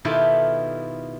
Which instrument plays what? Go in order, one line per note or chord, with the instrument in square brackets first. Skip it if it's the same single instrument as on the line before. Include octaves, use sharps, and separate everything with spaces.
[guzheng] B2 D#3 E4 F4 G4 A4